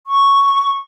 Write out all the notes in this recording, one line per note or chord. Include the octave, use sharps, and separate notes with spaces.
C#6